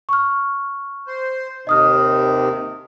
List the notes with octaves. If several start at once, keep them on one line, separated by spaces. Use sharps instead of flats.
C#6 F6
C5
D#2 C3 D#3 D#5 D#6 F6